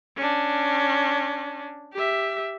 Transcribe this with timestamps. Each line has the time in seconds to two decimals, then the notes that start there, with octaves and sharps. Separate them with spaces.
0.17 C#4 D4
1.94 G4 E5